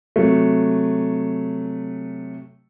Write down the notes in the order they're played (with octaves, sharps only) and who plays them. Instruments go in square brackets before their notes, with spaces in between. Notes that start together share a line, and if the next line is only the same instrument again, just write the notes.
[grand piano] C3 F#3 A3